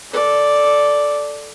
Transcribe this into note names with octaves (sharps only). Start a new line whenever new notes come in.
A4 D5